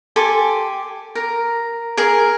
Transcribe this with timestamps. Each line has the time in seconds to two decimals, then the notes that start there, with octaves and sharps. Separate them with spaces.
0.16 G4 A4 G#5 C6
1.15 A#4
1.97 G#4 A#4